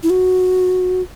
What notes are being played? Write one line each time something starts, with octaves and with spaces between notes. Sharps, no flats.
E4
F#4